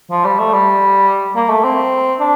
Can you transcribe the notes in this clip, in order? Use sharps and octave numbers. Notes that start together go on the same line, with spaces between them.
F3
G3
A3
G3
A#3
A3
C4
D4